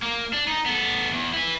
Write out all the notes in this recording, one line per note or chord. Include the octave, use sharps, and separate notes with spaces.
A#3
D4
D#4
B3 A4
E2
E4 B4